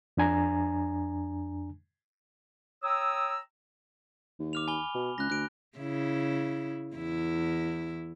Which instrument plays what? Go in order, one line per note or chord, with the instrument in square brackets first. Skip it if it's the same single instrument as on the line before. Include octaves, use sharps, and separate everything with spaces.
[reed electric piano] F2 D4 G#5 A#5
[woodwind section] C#5 G5 A#5 D#6 E6
[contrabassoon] D#2
[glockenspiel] D6 F6 F7
G#5 B5 G7
[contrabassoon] B2
[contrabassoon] C#2 [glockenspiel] F#6 A#6
[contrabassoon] D2 [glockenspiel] F#6 D7
[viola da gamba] C#3 E4
E2 E4